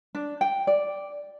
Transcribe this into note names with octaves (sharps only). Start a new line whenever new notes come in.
D4
G5
D5